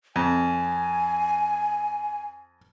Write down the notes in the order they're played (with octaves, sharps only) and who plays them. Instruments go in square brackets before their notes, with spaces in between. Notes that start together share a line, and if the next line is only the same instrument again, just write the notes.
[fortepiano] F2 [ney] G#5